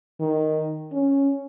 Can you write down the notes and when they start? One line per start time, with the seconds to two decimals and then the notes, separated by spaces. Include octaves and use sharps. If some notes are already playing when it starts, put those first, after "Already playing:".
0.21 D#3
0.92 C#4